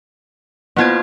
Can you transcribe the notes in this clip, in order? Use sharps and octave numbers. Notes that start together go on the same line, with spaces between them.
A#3 B3 E4 F4 C5 G#6